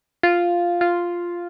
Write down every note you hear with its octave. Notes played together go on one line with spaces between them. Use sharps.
F4
F4